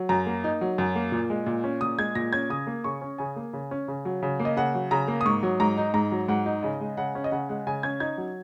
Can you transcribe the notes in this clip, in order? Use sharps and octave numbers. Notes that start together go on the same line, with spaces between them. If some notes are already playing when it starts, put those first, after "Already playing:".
Already playing: F#3
F#2 A#5
A#3
D#4
F#3
F#2
A#3
A#2
G#3
A#2
C#4
A#2 D#6
G#3 G#6
A#2 A#6
C#4 G#6
C#3 D#6
A#3
C#3 C#6
C#4
C#3 G#5
A#3
C#3
C#4
C#3
F#3
C#3
A#3
D#5
C#3 F#5
F#3
C#3 A#5
A#3
D#6
G#2 C#6
F#3
G#2 A#5
D#4
G#2 A#5
F#3
G#2 F#5
D#4
C#3 D#5
G#3
C#3 F#5
C#4
D#5
C#3 F#5
G#3 F#5
C#3 G#5
C#4 G#6
D#4 G#6
F#3